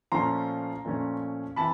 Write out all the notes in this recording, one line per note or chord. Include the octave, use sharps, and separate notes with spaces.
A#2 F3 A3 C#4 A#5 C6
A#2 F3 A3 C#4
C3 E3 A5 B5